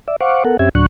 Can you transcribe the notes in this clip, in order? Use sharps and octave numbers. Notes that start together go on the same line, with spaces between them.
D5 E5
C5 F5 F#5 C#6 D6
B3 A4 A#4 F#5
F#2 C4 C#4 G4 E5 G#6
D2 A2 F#3 D4 C#6 F#6